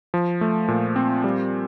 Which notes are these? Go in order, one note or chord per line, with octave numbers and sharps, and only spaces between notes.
F3
A3
A#2
C4
G3